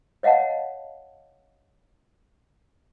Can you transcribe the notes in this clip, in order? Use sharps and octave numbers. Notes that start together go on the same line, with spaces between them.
C#5 D#5 F5 F#5 A5